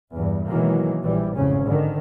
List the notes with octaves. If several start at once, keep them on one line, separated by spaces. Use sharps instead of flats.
E2 G2
B2 D#3 E3 F#3 G#3 A#3
A#1 E3 G3
G#1 F2 A2 C#3 C#4
G#2 D3 D#3